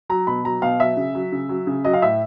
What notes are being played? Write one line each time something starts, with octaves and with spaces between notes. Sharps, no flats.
F#3 A#5
B2 B5
F#3 A#5
B2 F5
F#3 E5
C#3
F#3
C#3
F#3
C#3
F#3 D#5
F5
A2 E5